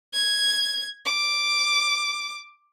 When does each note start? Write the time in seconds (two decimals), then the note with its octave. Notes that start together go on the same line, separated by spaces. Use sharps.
0.14 G#6
1.05 D6